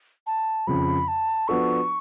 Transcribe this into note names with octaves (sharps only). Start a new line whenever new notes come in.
A5
F2 C#3 F3 B5
A5
F3 B3 D4 F#4 A4 C#6